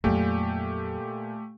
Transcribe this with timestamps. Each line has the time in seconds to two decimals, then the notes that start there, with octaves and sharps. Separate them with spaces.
0.04 F2 A#2 F#3 A3 G4